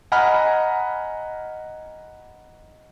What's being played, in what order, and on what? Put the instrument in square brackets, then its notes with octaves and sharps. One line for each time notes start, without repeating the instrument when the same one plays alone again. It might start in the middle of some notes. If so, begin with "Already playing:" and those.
[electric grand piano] D#5 F#5 G#5 A#5 B5 F6